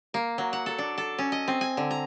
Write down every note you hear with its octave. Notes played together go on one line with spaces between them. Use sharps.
A#3
F#3
F#5
A4
D4
A4
C#4
D#5
C4
G#5
D3
A#5